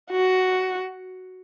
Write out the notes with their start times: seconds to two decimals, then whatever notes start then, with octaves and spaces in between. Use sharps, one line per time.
0.11 F#4